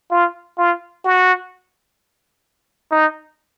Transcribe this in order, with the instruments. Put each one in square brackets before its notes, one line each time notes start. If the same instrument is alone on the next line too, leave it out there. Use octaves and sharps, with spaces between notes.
[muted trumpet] F4
F4
F#4
D#4